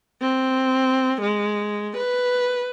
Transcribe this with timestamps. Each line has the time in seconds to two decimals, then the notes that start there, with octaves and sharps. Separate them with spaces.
0.22 C4
1.22 G#3
1.97 B4